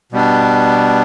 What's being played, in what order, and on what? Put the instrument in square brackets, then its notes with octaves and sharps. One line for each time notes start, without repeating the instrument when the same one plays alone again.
[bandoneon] B2 G3 B3 D4